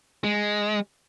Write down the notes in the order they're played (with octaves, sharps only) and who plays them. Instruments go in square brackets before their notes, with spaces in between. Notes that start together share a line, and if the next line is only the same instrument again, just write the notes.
[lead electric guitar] G#3